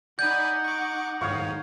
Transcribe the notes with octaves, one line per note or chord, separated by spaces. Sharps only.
D#4 D5 F#5 G#5 B5 G6
C#6 D6
G#2 D#3 C#5 F5 C#6